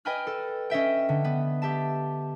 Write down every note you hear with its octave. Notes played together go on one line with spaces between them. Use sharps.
B4 D#5 G5 G#5 B5 F6
A4
C#4 D#5 E5 G5
D3
B3
G4 E5 A5